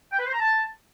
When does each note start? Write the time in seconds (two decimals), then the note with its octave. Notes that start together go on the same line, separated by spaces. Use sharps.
0.12 G5
0.19 B4
0.26 C5
0.33 A#5
0.39 A5